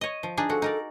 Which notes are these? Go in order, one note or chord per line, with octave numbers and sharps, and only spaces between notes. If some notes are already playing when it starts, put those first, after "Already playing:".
C#5 D#5
F3
D4 D#4 G#4
F3 F#4 A4
D#4 A#4 D5